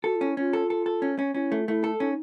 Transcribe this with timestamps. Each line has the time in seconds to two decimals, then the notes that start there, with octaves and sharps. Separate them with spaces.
0.04 F#4 A4
0.16 F4
0.21 C#4
0.27 E4
0.37 C#4 F4
0.53 A4
0.70 A4
0.86 A4
1.02 C#4
1.19 C#4
1.34 C#4 F4
1.38 E4
1.52 A3
1.59 F4
1.68 A3 E4
1.84 A4
2.00 C#4 E4
2.04 D#4